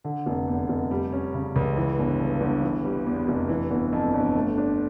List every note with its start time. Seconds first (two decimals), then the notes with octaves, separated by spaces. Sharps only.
0.04 D3
0.26 F1
0.47 E2
0.69 F1
0.91 G3
1.13 C#4
1.34 C#3
1.56 C#2
1.77 E3
1.98 G1
2.20 G2
2.41 G1
2.63 E3
2.84 G3
3.06 E2
3.28 F1
3.49 E3
3.70 G1
3.93 F2
4.14 G1
4.36 A3
4.58 D4